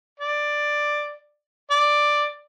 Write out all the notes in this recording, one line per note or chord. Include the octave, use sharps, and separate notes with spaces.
D5
D5